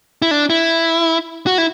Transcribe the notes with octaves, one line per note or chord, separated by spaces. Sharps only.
E4
D4
E4
F#4
E4